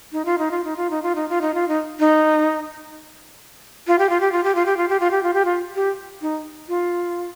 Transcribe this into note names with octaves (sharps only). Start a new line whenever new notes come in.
D#4
F4
D#4
F4
D#4
F4
D#4
F4
D#4
F4
D#4
F4
D#4
D#4
F4
G4
F4
G4
F4
G4
F4
G4
F4
G4
F4
G4
F4
G4
F4
G4
D#4
F4